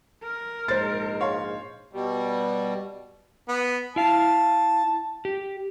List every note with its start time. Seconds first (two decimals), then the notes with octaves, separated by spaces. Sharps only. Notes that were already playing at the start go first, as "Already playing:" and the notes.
0.23 A#4
0.68 A#1 G#2 G#3 C5 A6
1.21 C#5 F5 C6
1.93 B2 G3
3.48 B3
3.96 E4 F5 A5
5.25 G4